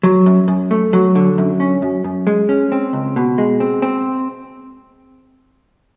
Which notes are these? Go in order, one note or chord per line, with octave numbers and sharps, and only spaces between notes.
F#3
F#2
F#2
A3
F#3
D3
F#2
C#4
F#2
F#2
G#3
C#4
C4
C#2
B2
G#3
C4
C4